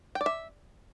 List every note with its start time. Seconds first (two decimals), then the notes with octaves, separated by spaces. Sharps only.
0.15 G5
0.21 D5
0.26 E5